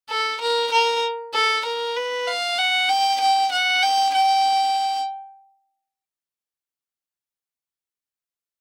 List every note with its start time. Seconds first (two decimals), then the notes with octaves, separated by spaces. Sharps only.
0.09 A4
0.41 A#4
0.72 A#4
1.33 A4
1.65 A#4
1.96 B4
2.27 F5
2.58 F#5
2.89 G5
3.20 G5
3.52 F#5
3.82 G5
4.14 G5